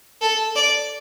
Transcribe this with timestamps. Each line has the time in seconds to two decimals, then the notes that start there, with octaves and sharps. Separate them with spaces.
0.21 A4
0.56 D5